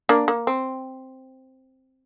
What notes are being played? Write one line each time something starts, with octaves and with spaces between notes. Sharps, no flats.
A#3 D4
A#3
C4